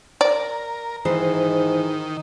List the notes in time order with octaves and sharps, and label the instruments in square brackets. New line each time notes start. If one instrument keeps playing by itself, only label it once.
[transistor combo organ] A#4 [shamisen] D5
[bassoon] G#2 [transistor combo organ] D#3 [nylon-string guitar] E3 C5